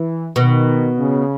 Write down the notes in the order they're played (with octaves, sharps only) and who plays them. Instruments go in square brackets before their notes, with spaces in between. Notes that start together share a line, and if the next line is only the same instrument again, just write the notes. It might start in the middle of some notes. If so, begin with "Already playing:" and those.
Already playing: [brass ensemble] E3
[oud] B2 [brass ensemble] D#3
[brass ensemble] C#3